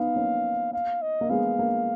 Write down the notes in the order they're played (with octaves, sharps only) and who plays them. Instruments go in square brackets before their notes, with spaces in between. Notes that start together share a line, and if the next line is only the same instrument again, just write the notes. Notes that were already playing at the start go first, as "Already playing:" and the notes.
Already playing: [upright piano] B3 D#4 [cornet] F5
[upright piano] A#3 C#4
[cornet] F5
D#5
[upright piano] A#3
[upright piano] G#3 B3 [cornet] F5
[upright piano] A#3